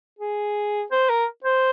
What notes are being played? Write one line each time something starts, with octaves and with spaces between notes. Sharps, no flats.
G#4
C5
A#4
C5